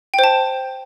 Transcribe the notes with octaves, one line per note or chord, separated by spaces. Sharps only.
C5 G5 A5